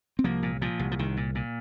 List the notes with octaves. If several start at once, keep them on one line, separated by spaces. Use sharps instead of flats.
C4
C2 F3 A#3
A#2
A#2 F3
C2
F3
C2 D#3
A#2
A#2